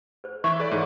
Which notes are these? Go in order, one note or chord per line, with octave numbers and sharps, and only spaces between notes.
B4 C5
E3 E5 C#6
A4 B4 C#5 D5
G#2 E3